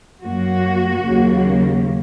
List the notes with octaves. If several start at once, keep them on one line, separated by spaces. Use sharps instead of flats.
F#2 F#3 A#3 F#4
D#2 C#3 F#3 A#3